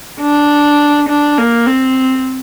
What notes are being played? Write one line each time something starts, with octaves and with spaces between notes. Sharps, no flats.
D4
D4
A#3
C4